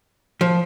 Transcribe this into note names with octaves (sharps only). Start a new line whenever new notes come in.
F3